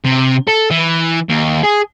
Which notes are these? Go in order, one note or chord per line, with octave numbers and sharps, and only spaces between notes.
C3
A4
E3
D#2
G#4